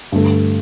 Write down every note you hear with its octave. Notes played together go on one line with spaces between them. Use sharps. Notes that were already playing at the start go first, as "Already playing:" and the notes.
G2 D3 A3